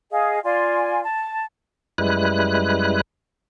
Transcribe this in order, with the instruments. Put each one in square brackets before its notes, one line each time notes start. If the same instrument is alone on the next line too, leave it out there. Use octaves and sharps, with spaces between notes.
[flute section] G#4 D#5 F5
F4 D5 G#5 C6
A5
[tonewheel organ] F#2 G3 G#3 E4 B4 F#6